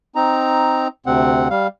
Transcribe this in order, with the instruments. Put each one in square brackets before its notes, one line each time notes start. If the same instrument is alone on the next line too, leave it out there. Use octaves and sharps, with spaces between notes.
[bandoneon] C4 D#4 A#5
D2 C3 C4 F#5
G3 F5